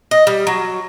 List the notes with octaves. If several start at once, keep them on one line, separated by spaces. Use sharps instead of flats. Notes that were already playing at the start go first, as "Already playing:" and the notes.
D#5
G3
F#3